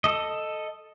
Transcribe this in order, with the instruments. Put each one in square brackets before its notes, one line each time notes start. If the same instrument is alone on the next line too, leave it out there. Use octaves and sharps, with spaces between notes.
[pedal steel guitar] A4 D#5